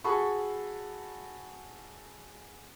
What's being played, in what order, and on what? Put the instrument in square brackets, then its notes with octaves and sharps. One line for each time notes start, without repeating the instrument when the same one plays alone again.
[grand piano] F#4 G#4 A4 B5 C#6